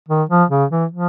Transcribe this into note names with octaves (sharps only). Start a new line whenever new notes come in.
D#3
F3
C#3
E3
F3